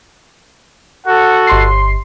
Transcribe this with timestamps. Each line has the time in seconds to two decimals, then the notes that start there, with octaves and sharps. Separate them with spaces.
1.07 F#4 A4 F#5
1.47 G1 C6 C7